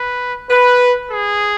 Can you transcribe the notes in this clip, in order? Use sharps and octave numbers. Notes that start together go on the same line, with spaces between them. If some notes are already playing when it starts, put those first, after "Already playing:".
Already playing: B4
B4
G#4